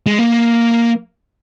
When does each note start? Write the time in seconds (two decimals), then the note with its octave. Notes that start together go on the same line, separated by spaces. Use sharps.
0.07 G#3
0.19 A#3